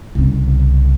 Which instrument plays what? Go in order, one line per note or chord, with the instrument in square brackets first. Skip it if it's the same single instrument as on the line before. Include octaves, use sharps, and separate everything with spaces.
[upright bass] C2 C#3